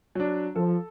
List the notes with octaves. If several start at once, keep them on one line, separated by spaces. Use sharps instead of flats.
F#3 D4
F3 A4